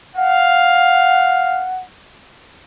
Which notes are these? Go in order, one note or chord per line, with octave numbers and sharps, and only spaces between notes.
F5 F#5